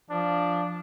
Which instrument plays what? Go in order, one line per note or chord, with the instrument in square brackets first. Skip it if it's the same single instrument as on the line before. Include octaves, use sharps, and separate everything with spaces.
[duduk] F3 [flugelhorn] D4